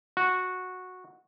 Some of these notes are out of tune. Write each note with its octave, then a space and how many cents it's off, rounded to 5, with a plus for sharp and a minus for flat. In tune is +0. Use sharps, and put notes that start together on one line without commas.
F#4 -10